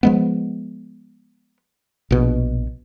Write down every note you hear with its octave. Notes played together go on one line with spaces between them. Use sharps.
F3 G#3 B3
A#1 B2